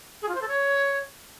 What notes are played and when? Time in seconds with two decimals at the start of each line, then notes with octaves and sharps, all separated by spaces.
0.22 G#4
0.29 F4
0.35 C5
0.42 A4
0.48 C#5